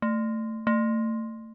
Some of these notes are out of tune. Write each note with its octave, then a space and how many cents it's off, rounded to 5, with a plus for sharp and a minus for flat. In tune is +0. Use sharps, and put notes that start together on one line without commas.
A3 +15
A3 +30